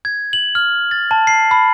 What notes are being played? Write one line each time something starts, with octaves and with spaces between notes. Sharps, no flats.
G#6
F#7
F6
A6
A5
C7
B5